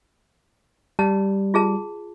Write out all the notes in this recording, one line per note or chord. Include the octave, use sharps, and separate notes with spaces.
G3 A5
F4 G#4 A5